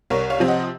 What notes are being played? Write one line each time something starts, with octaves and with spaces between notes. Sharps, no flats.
C2 A#4 C#5
C#5 F5
C3 F3 C4
D#5 F#5